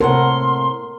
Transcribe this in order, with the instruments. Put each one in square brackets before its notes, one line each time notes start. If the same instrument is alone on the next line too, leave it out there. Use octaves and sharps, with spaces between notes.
[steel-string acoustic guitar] A2 C3 F#5 [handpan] A#4 [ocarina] C6